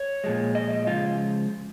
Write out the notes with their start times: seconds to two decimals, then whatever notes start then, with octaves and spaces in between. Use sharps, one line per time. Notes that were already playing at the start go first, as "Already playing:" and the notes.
Already playing: C#5
0.24 A#2 F3 G#3
0.55 D#5
0.71 D#5
0.87 C#3 F3 G#3 F4